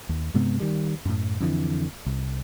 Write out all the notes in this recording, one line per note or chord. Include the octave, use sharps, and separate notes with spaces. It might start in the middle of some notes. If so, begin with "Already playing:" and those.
D#2
G2 C3 G#3 B3
D#3 G3
F#2 A2
F2 D3 E3
C2